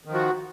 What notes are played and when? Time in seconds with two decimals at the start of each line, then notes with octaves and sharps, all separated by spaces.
0.05 D#3
0.10 F3
0.14 F#4